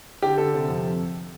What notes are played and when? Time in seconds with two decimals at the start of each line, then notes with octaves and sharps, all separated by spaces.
0.22 D3 G4
0.38 D3 A4
0.54 C3
0.68 F2